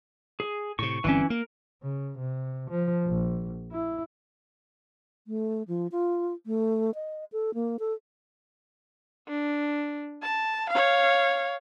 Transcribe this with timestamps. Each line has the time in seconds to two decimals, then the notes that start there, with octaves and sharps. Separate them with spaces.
0.40 G#4
0.79 A2 C3 C#6
1.04 G1 E3 G3 C4 C#4
1.30 A#3 A#4
1.82 C#3
2.18 C3
2.70 F3
3.05 A#1
3.72 E4
5.27 A3
5.68 F3
5.92 F4
6.46 A3
6.95 D#5
7.32 A4
7.54 A#3
7.80 A4
9.28 D4
10.23 A5
10.70 C#5 F5